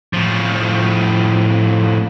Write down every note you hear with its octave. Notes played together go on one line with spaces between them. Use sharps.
A2 F3